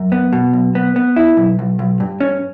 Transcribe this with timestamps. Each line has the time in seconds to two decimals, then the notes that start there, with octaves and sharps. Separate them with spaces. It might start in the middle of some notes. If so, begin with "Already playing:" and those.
Already playing: F#2
0.12 B3
0.33 B2
0.53 B1
0.75 B3
0.96 B3
1.16 E4
1.37 B1
1.59 B1
1.79 B1
2.00 G2
2.20 C#4